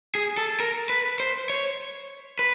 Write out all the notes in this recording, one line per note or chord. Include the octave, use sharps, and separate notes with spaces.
G#4
A4
A#4
B4
C5
C#5
B4